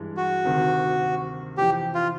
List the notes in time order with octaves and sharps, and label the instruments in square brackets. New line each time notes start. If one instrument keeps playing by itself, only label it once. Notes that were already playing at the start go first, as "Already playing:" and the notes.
Already playing: [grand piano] G2 E3 G#3
[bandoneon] F#4
[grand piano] D2 C3 D#3
[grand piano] F2 C3 E3 [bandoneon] G4
[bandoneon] F4